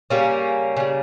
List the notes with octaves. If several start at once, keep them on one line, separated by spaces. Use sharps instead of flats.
C#3 G3 A#3 C#4
C#3 G3